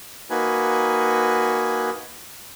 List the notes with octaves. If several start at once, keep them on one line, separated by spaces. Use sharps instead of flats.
A#3 D#4 F#4 B4 G#5